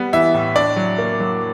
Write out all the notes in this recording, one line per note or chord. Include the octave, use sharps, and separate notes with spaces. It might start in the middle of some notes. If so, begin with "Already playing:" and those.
Already playing: G3 B3
E3 E5
A2
D4 D5
F#3
A#3
F#3